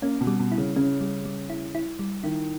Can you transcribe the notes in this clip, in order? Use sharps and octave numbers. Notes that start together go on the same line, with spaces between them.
A#3 C#4
B2
G3
B2
E4
C#3
C#3 C#4
G3
G3
E4
E4
G3
D#3 E4